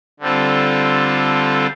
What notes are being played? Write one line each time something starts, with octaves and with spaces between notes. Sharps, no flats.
D3 G3 C4 F4 A4